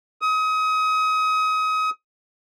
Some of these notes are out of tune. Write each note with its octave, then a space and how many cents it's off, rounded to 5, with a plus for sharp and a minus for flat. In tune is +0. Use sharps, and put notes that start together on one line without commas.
D#6 +30